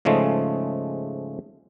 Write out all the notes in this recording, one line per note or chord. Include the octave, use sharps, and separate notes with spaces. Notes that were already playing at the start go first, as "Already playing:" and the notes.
G#2 C#3 F3 G#3 A3